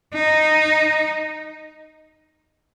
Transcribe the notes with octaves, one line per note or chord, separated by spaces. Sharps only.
D#4